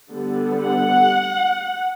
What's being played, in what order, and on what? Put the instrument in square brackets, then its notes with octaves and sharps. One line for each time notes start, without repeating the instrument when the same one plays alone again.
[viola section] D3 G3 B3
F#5